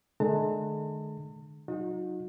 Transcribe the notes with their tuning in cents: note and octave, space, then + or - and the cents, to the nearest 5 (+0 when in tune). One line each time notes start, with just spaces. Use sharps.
D3 +45 G#3 +40 A5 +45
F#3 +0 D#4 +0 F#4 -40